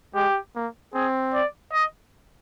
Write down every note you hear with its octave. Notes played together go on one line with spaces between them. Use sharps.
G#3 G4
A#3
C4 G#4
D5
D#5